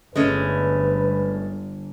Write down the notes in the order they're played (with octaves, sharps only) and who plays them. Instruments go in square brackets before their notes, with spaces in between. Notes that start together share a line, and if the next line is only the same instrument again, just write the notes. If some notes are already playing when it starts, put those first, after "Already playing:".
[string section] G1 [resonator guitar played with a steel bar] G#3 A3 C#4 [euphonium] B4